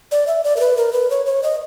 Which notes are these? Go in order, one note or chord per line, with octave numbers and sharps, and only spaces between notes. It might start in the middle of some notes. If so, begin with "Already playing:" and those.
D5
E5
D5
A#4
B4
A#4
B4
C#5
C#5
D#5